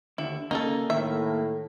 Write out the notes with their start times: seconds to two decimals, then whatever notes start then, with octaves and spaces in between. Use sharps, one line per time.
0.18 D#2 D3 E4
0.51 C#3 A#3 D#4 G#4 A4
0.90 A2 D#3 E5